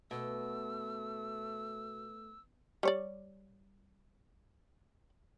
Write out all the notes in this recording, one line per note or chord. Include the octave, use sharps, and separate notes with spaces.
B2 A3 E6
G3 C#5 D5